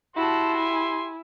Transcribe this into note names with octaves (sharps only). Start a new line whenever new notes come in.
E4 F#4 G4 A5 C6
G#5